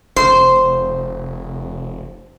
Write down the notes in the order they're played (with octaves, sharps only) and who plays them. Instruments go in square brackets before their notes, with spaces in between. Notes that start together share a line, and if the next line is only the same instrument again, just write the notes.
[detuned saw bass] F1 [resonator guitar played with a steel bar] C5